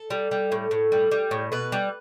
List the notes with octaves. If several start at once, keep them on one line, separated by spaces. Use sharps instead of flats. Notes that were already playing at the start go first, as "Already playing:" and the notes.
Already playing: A4
G3
G3
A2
A2
G3
G3
A2
B2 B4
G3